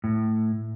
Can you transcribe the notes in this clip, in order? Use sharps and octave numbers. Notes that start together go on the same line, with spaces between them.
A2